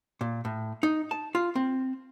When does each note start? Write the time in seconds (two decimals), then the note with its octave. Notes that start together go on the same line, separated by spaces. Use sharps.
0.21 A#2
0.45 A2
0.83 D#4
1.11 A5
1.35 F4
1.55 C4